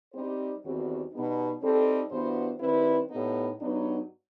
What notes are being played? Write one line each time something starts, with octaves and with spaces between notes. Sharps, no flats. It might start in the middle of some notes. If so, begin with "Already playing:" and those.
G3 C4 D#4 G4 C5
E2 D#3 G3 C4 F#4
B2 G3 B3 D#4
G3 C4 D#4 A4
G2 E3 B3 F#4 C5
D#3 G3 C4 E4 B4
A2 G3 B3 D#4
G2 F#3 B3 D#4